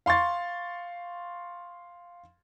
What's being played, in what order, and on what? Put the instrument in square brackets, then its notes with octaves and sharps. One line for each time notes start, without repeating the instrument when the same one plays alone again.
[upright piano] F5 C6 C#6 A6